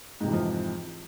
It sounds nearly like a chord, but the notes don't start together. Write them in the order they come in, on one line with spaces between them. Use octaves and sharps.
G#2 C3 F2 E3 F3